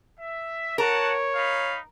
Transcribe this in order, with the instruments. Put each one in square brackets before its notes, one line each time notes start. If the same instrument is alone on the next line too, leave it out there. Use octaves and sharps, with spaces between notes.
[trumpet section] E5
[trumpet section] F#4 F#5 A5 [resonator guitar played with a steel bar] A#4 [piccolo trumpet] C#5
[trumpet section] D#4 F5 B5